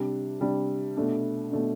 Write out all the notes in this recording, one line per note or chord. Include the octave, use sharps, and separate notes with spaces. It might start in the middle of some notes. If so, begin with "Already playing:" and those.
Already playing: C3 G3 D4
C3 G3 D4
B2 A3 D4
B2 A3 D4